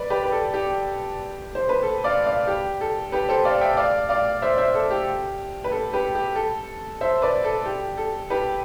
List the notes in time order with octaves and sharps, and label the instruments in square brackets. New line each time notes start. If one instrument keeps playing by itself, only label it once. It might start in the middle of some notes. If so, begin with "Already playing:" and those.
Already playing: [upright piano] B4 D5
G4 B4
B4
A4
G4
C5
B4
A4
D5 F5
D5 F5
G4
A4
G4 B4
A4 C5
D5 F5
E5 G5
D5 F5
D5 F5
C5 E5
C5 E5
A4
G4
B4
A4
G4 B4
G4
A4
C5 E5
B4 D5
A4
G4
A4
G4 B4